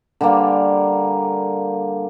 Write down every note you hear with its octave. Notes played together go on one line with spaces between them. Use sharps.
D3 G3 A#3